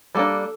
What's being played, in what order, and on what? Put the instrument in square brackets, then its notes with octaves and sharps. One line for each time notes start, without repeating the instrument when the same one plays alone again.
[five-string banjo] G3 A#3 D4 A4